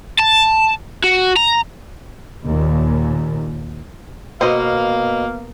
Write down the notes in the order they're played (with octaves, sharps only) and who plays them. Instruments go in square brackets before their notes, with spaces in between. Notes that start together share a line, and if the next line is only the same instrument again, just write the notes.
[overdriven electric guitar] A5
F#4
A#5
[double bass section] D#2 A#2
[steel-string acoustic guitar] B2 [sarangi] A#3 [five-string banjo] C5 D#5 [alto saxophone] F5